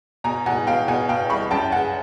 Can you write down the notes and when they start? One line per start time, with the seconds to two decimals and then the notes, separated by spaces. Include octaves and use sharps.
0.24 B2 G#5 A#5
0.46 B2 F#5 G#5
0.67 B2 F5 G5
0.88 B2 F#5 G#5
1.09 B2 F5 G5
1.30 C2 B5 C#6
1.51 F#2 G5 A5
1.72 C#3 F#5 G#5